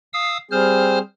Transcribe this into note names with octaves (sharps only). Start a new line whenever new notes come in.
F5 D#6 E6
G3 C4 G#4 C5 F6